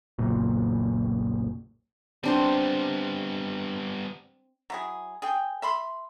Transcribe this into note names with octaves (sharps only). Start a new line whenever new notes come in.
F#1 B1 A#2
G3 B3 C4 D4 C5
F#3 E4 G#4
G#4 G5
E5 B5 C6